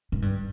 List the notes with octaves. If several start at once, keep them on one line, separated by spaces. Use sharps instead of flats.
G#2
G2